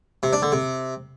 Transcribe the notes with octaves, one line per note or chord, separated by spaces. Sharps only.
C3
D4
D3
C3